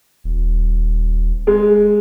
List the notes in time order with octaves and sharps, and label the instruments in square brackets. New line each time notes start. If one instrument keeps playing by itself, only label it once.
[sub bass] D#1
[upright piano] G#3